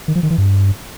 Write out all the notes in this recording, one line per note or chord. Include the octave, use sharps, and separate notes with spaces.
D#3
F3
D#3
E3
G2